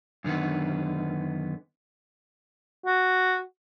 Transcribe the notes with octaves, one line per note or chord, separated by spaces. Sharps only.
F#2 D3 D#3 B3
F#4